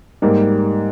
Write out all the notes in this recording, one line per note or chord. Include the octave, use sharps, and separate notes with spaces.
G#2 G3 A#3